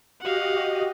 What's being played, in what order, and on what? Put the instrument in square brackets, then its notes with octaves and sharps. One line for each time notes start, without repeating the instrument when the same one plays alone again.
[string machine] F#4 G4 D#5 [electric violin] F5 F#5